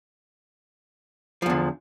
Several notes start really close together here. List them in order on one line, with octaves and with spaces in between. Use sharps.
F3 E2 D3